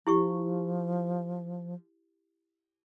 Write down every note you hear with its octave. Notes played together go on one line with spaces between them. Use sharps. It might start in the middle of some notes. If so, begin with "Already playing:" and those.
F3 E4 G4 C#6